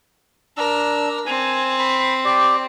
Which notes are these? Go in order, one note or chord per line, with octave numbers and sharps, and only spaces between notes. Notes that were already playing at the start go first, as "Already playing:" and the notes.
D4 A#4 E6
C4 G#5
B5
G4 D5